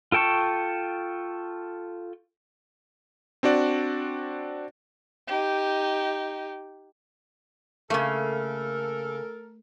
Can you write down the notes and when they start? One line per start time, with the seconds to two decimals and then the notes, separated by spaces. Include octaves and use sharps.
0.12 F4 A4 G5 A5 C#6
3.43 C4 D4 F#4 D5
5.28 D#4 G4
7.90 C#3 A3 A#3 A4 A#4